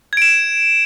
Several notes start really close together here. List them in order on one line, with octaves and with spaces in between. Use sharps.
G#6 D7 E7